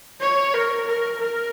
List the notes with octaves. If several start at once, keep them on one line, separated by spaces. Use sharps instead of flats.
C#5
A#4
A#4
A#4